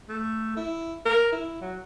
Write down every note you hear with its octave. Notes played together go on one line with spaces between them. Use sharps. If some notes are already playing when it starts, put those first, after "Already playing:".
A3
E4
A#4
E4
F#3